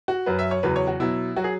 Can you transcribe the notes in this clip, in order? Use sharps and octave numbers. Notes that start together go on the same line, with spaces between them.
F#4
F#2 F#3 B4
E5
C#5
E2 C#3 F#3 B4
C#5
F#4
B2 F#3 E4
F#3 F#4
G#4